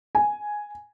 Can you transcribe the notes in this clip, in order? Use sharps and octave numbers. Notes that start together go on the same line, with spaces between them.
G#5